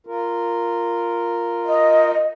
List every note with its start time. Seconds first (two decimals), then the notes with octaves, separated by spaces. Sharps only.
0.07 F4 A#4
1.66 D#5